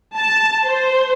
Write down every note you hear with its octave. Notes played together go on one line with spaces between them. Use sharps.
A5
C5